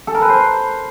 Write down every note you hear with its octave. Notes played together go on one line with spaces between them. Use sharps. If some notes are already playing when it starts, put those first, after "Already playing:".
A4
A#4
B4
C5